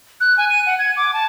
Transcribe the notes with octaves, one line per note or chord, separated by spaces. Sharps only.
F#6
G#5
D#7
F#5
G#6
D6
A5